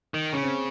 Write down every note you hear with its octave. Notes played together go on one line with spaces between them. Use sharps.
D#3
C#3 C#4
C4